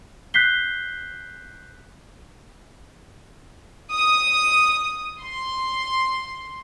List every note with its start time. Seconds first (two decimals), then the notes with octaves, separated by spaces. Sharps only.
0.34 F#6 G6 B6 C7 G7
3.91 D#6
5.21 C6